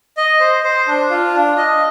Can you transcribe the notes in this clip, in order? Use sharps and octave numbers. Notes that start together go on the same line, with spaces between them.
D#5
C5
C5
D4
F4
D4
D#5